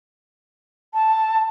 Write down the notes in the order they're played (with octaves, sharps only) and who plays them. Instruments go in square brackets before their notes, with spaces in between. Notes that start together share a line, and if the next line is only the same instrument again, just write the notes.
[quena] A5